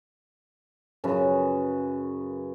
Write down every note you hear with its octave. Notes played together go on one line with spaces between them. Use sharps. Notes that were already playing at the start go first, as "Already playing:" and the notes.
F#2 C#3 B4